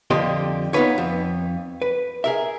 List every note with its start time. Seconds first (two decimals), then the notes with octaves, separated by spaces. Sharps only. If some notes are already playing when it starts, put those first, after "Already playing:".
0.11 F2 D3 F4 G4 D#5 C6
0.73 B3 D#4 F4 B4 C#5
0.98 F2
1.82 B4
2.24 G#4 A#4 E5